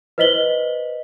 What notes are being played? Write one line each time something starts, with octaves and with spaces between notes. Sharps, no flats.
B4 C5 D#5 B6 F#7 G7